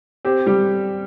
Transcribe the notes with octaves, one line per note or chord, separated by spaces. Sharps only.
C4 G4
G3 G4